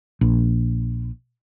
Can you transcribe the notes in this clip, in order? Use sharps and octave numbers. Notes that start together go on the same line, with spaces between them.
A#1